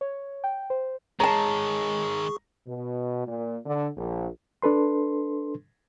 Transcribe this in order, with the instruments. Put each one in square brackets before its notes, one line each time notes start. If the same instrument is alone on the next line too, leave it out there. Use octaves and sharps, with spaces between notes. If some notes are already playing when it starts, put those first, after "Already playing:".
[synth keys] C#5
G5
C5
[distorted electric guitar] D#3 G#3 [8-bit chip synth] G#4 C#6 [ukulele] C#5 A5 [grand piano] A#5
[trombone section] B2
A#2
D3
A#1
[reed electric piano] D4 A4 B4 C6